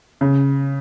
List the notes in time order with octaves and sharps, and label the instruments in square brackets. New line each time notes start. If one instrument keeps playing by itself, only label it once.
[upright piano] C#3